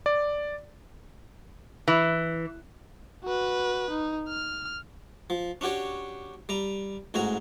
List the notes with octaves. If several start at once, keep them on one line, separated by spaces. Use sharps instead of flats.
D5
E3
F#4 B4
D#4
F6
F3
C#4 D4 F#4 G4 C#5
G3 A#5
A1 G#2 F#4 G#5 A#5